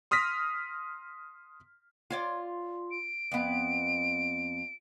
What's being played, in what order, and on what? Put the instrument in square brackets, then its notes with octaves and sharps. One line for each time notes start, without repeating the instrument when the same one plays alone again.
[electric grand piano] C6 D#6 F6 A#6 B6
[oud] F4 C#5 D5
[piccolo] D7
[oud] F2 B3